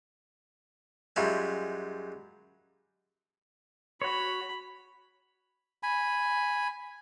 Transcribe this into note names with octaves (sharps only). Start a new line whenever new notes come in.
F#2 G3 G#3 F4 F#4 E5
F#4 C#5 B5
G#5 B5